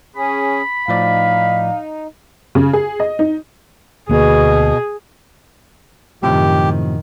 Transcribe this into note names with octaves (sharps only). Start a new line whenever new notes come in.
C#4 G#4 B5
A2 F3 D#4 D5 F5
C#3
G#4
D#5
D#4
D2 B2 A#3 G#4
F#2 A2 C3 D#3 F3 G4